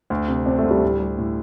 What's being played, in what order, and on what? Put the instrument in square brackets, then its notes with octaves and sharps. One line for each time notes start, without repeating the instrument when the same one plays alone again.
[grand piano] D2
C3
[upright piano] C4 [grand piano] D4
[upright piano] A3
[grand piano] D2
[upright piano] G3
[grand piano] A2
G3
A2